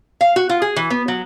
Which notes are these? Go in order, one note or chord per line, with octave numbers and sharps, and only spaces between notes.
F5
F#4
F4
G#4
E3
B3
F#3